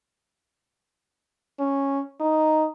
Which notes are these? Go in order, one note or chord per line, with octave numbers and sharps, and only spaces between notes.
C#4
D#4